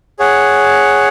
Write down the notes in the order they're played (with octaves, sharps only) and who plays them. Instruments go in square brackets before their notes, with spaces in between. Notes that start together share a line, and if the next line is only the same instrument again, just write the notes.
[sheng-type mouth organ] G#4 C#5 F#5